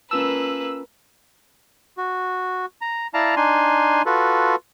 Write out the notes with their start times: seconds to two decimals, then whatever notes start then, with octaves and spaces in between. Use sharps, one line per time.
0.11 A#3 C#4 F4 B4 A5 E6
1.98 F#4
2.81 A#5
3.14 E4 D5 F5 A5 A#5
3.37 D4 D#4 G#5 C6
4.06 F4 F#4 A4 B4